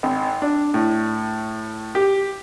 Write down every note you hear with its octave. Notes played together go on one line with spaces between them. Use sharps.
G#1
D4
A2
G4